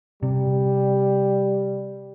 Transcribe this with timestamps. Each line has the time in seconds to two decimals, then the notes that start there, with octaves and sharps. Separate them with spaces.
0.23 C3 G3